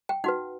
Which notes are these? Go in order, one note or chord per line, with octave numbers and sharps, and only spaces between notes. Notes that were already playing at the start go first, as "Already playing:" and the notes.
G5
D#4 F#4 B4 F#5